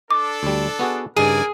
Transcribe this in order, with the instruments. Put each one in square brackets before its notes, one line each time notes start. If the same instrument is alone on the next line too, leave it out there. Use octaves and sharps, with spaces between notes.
[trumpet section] D4 A4 [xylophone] D6
[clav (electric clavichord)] D2 G3
B3 F#4 G#4
[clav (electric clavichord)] G2 C#3 D#4 [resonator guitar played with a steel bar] G#4 [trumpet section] A#4 D5 G#5